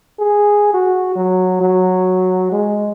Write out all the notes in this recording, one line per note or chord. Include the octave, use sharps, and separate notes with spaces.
G#4
F#4
F#3
F#3
G#3